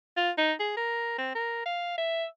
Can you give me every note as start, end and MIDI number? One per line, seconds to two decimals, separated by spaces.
0.17 0.31 65
0.38 0.53 63
0.60 0.72 68
0.77 1.15 70
1.18 1.34 60
1.35 1.61 70
1.65 1.95 77
1.98 2.26 76